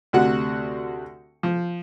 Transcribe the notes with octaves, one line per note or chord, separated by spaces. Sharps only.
D2 C3 F#4 F#5
F3